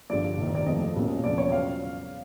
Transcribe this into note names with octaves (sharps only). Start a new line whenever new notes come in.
G1 G2 D3 F3 D5
F1 D#2 D#3
D5
F2 C3 F3 A3 D#5
B1 A#2 G3 A#3 C#4
E1 E2 C#3 F3 D5
C#5
C#3 F#3 F5